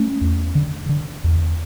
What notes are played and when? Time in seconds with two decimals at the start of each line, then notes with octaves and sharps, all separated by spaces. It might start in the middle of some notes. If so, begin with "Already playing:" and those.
Already playing: A3 C#4
0.21 E2
0.55 D3
0.89 D3
1.24 E2